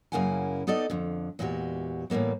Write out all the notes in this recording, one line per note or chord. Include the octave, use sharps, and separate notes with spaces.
F#2 C#3 A#3 E4 F#5 G#5
B3 D#4 A4 D5 D#5
F2 D3
E2 A#2 G#3 F#4 G4
A2 E3 G3 A#3 B3